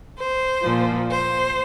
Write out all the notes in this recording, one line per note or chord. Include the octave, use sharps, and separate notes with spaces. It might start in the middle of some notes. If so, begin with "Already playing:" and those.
C5
A#2 F3
C5